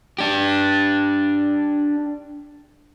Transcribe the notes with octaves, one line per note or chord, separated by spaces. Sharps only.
D4 G4